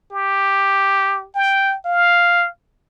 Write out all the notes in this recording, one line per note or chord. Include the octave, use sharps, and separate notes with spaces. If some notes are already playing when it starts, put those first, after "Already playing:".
G4
G5
F5